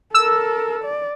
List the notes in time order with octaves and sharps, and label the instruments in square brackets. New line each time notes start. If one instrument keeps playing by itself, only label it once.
[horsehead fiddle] A4 A#4 [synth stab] E6
[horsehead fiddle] D5